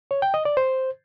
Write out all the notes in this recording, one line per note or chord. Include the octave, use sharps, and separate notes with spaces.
C#5
G5
D#5
D5
C5